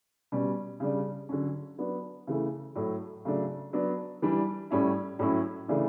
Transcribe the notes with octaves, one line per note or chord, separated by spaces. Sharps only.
B2 G3 C#4
C#3 G3 D4
D3 F#3 C#4
F#3 B3 D4
C#3 E3 A3
A2 F#3 A3
C#3 F#3 A3 D4
F#3 B3 D4
E3 G3 D4
A2 G3 C#4 E4
A2 F#3 C#4 E4
C#3 E3 A3 D4